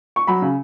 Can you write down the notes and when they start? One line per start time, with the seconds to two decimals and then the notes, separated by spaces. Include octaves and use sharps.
0.16 C#6
0.27 F#3 B5
0.42 C#3